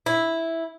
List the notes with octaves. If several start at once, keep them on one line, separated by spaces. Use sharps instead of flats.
E4